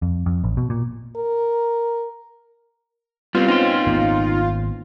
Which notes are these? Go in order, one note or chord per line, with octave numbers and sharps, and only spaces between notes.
F2
F2
A1
B2
A#2
A#4
G3 B3 C4 F4
C4 C#4 D#4 C6
G#1 A#3 B3